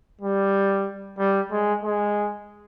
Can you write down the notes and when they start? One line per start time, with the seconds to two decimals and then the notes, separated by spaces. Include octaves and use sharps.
0.22 G3
1.19 G3
1.52 G#3
1.83 G#3